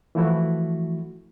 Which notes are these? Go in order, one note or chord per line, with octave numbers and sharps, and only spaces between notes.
E3 F3 A3 E4 F#4